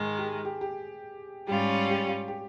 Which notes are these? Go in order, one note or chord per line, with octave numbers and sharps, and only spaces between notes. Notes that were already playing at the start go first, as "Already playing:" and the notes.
Already playing: G#2 D#3 G#3 G#4
G4
G4
G4
G#2 G3 C#4 F4 G4
G4
G4